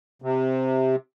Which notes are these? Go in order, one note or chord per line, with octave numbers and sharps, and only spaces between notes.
C3